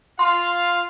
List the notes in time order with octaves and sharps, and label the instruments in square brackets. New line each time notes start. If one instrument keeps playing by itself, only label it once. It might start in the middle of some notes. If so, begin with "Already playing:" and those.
[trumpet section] F4 F5 [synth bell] C6